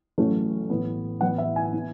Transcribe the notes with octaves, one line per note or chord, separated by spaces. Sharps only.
A1 A2 F#3 A3 C#4
A1 A2 E3 B3
A1 A2 E3 B3 F#5
E5
G#5
E3 B3